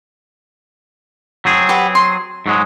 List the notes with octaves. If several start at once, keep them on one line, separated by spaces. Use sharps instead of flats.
F#3 C4 G#4
G4 B4 F#5
C6
G#2 F#3 G#3